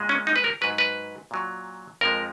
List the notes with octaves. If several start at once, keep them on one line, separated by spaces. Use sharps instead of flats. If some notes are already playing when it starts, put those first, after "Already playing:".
Already playing: A#2 G#3
C#4
D#4
B4
A#4
G#2 F#3 B4
B4
A#2 F#3
F2 F3 G#3 A#4